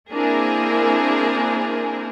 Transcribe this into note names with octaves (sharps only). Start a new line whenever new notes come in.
A#3 C4 D4 E4 G#4 A#4